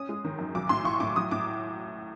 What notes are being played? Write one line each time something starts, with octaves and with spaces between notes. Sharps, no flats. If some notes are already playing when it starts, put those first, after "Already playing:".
Already playing: C#4 D#6
G#3
D#3
F#2
B1 D6
A2 C6
B1 C#6
A2 D6
F#3 D#6
A2 D6